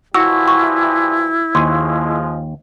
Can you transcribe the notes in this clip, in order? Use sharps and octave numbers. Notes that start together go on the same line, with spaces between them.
E3 F3 G3 E4 F#4 E6
C#6
D#2 F3 G#3 G#5 C6